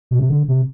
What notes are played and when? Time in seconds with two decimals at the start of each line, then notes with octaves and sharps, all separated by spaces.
0.11 B2
0.19 C3
0.30 D3
0.48 C3